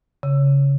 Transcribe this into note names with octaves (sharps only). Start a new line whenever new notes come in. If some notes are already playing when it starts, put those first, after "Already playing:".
C#3